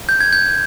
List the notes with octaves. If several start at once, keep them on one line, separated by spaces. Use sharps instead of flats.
G6
G#6
G6